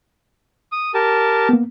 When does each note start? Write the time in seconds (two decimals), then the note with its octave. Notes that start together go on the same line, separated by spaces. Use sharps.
0.72 D#6
0.94 G4 A#4 A5
1.49 A#3 B3